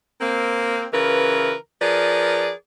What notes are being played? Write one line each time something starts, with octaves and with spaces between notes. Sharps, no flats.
A#3 C4
C#3 E3 F4 A#4 B4
F3 G#4 A#4 B4 D5